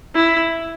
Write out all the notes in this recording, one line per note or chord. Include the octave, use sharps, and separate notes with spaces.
E4